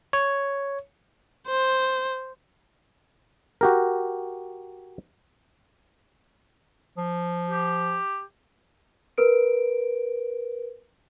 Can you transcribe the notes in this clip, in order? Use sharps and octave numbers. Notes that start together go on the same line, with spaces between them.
C#5
C5
F#4 G4 A#4
F3
G4
A#4 B4 D7